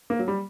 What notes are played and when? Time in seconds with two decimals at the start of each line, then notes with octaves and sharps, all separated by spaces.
0.10 A#3
0.19 F#3
0.28 G3